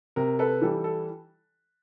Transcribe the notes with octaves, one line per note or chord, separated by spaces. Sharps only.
C3 A#4
A4 B4
E3 G3 A4
A4